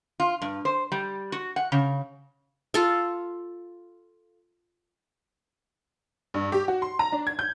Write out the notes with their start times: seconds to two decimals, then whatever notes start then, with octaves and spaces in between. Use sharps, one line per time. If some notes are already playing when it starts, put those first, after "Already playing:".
0.20 F4
0.42 G2
0.65 C5
0.92 G3
1.32 F#4
1.56 F#5
1.72 C#3
2.74 F4 A4 F5
6.34 G2
6.52 G4
6.68 F#4
6.82 C6
6.99 A#5
7.12 D4
7.27 G#6
7.39 G6